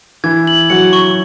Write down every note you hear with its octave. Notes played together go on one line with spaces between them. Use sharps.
E3 E4 G#6
F#7
F#3 F#4 C#7
C#6